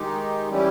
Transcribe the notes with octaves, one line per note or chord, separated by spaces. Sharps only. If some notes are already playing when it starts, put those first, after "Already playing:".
Already playing: D#3 G#3 D#4 G4
E3 G3 C#4 E4 G4